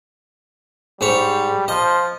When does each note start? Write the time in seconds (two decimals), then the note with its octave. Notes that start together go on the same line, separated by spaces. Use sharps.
1.01 G#2 G3 C#5
1.68 F3 D#5